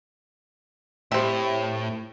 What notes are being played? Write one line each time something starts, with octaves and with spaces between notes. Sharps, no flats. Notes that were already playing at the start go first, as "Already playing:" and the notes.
A2 C4 G4 D#5 E5 G5